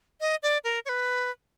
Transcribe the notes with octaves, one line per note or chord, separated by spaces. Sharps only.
D#5
D5
A#4
C#5
B4